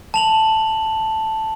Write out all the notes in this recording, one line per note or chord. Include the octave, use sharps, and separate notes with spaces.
A5 F7 F#7